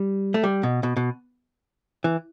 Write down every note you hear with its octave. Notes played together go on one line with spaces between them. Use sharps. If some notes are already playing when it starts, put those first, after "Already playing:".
Already playing: G3
A3
G3
B2
B2
B2
E3